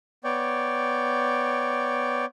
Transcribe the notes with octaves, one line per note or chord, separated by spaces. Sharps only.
B3 C#5 D5 G5